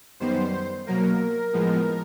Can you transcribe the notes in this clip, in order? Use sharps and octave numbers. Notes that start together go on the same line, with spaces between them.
F#2 D#3 G3 B3 C5
B2 F#3 A#3 A#4
A2 F3 G#3 B3